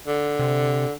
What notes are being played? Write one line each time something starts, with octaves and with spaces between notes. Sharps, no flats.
D3
C3